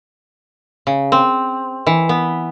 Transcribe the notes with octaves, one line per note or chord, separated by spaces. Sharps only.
C#3
C4
E3
B3